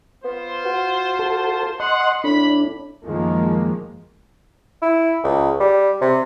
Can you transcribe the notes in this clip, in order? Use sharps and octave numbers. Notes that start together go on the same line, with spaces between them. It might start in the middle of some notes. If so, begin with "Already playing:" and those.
B3 F4 C5
F#4
A4
D#5 F#5 C6
A2 D4 B5
F#2 D#3 F3 G#3 A#3
E4
C#2
G3
C3